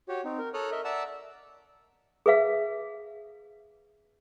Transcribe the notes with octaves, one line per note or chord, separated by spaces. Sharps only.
F#4 G4 C#5
C4 D#4
A#4
A4 C#5 A#5 D#6 F6 F#6
A#4 D#5 E5
D5 E5 F#5 A5 A#5 E6
G#4 B4 E5 F5